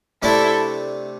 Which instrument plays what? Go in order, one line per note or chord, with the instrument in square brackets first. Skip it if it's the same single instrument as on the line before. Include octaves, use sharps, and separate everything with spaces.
[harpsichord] C3 A3 D4 [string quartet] E4 A4